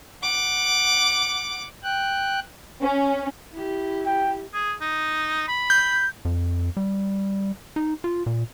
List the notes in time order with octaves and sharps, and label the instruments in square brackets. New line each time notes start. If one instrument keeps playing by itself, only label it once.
[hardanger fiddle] F#5 D6
[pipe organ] G5 F#6
[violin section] C#4
[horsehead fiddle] E4 G4
[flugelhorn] G5
[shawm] G#4
D#4
B5
[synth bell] G6
[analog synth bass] F2
G3
D#4
F4
A#2